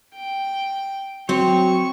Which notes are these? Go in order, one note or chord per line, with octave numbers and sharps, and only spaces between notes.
G5
F#3 C4 C#6